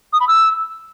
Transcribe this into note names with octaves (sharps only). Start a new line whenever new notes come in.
D#6
B5
E6